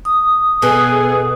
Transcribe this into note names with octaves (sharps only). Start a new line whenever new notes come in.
D#6
B2 G#4 A4